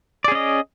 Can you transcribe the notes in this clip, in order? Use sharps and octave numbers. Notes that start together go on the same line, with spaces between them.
C#4 G#4 D5 D#5